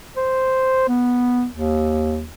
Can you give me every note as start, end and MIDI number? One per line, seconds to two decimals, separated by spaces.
0.16 0.86 72
0.88 1.46 59
1.51 2.26 39